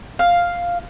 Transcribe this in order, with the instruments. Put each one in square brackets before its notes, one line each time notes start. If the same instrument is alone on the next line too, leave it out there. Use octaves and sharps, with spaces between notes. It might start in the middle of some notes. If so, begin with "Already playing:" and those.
[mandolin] F5